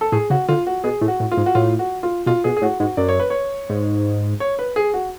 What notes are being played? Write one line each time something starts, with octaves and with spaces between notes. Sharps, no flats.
A4
A2 G#4
C#3 F#4
D3 F4
F#4
B2 G#4
A2
F#4
A2
F4
G#2
F#4
A2 F4
F#4
F4
B2 F4
B2 G#4
G#4
A2 F#4
G#2 F#4
F#2 D5
C#5
B4
C#5
G#2
C#5
B4
G#4
F#4